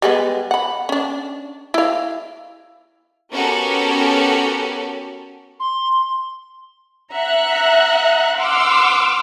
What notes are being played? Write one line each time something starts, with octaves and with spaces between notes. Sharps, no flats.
G3 G#3 B3
F#5 B5
C#4 D4
E4 F5
B3 C#4 F#4 G4 A4 A#4
C6
E5 F#5 A#5 F#6
F#5 C6 D6 E6 F6